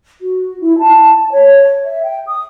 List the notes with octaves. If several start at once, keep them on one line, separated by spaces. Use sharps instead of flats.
F#4
E4
A5
C#5
E5
G5
D#6